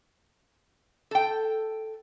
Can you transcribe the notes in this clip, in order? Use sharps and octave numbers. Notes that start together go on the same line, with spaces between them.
A4 G5